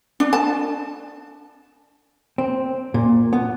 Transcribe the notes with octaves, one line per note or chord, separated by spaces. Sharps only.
D4
A5
C4
A#2
B3